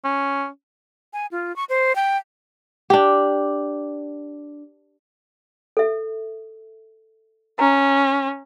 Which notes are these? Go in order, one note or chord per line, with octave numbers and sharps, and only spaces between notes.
C#4
G#5
F4
C#6
C5
G5
D4 G4
A4 E5
C#4 A#5